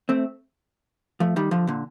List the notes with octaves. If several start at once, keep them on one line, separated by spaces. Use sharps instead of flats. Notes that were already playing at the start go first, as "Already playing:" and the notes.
A3 C4
F3 A3
D#3 G3
D3 F3
A#2 D3